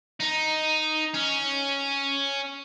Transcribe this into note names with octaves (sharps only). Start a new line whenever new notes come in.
D#4
C#4